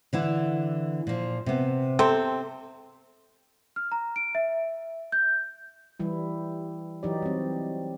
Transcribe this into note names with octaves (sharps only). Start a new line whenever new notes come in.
D3 E3 E4
A#2 F3
C3 B3
C3 C4 A4
F6
A#5
D7
E5
G6
E3 G3 E4
E3 F#3 D#4 G4 D5
G3 C4